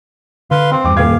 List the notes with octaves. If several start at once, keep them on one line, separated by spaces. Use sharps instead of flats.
D3 B4 F5 C6
C4 C6
E2 G2 G5 D6
D#1 F5 D6 G#6